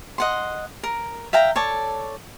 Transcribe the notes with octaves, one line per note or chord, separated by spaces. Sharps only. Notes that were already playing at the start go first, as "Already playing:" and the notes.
D#5 F#5 C6
A#4
E5 F5 G5 A#5
A4 C#5 D5 A5